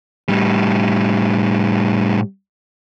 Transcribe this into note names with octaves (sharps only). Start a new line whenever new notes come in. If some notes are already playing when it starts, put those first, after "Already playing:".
A2 G3